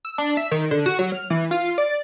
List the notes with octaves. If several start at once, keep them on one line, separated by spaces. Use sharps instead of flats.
E6
D4
E5
D#3
D3
F#4
F#3
F6
E3
F4
D5